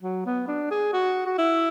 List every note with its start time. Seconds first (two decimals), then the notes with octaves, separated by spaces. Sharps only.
0.03 F#3
0.26 B3
0.48 D4
0.71 G#4
0.93 F#4
1.26 F#4
1.38 E4